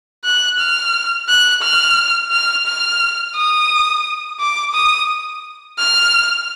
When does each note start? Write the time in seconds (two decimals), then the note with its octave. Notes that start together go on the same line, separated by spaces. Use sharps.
0.25 F#6
0.59 F6
1.29 F#6
1.63 F6
2.32 F6
2.67 F6
3.35 D#6
4.40 D6
4.74 D#6
5.79 F6